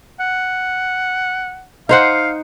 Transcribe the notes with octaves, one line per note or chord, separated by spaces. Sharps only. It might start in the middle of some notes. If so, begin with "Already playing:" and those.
F#5
D#4 C5 F5 F#5